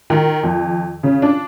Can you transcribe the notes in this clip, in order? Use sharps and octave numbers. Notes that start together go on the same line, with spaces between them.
D#3
F2
C#3
D4